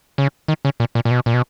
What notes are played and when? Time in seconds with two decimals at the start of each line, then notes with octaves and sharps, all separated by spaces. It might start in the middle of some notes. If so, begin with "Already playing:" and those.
0.18 C#3
0.48 D#3
0.65 C#3
0.80 A#2
0.95 A#2
1.05 A#2
1.11 B2
1.26 A#2
1.34 B2